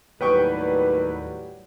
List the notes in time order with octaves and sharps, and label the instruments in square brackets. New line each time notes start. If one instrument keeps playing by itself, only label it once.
[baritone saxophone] D#2 [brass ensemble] A2 F#3 G3 [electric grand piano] B4 [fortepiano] C#5 G5 C#6